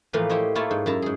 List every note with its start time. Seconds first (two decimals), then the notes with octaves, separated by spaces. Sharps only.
0.13 A2 E3 F3 A#3 B4 F5
0.29 E4 G4 C5 C#5 D#5
0.55 A3 A#3 E4 F4 C#5 A5
0.71 G#2
0.86 F#2 E4 A5 A#5
1.02 G#2 G#4